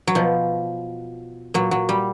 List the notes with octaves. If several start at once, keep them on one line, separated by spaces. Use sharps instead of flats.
F#3
B2 F3
A#2 F#3
F#3
G3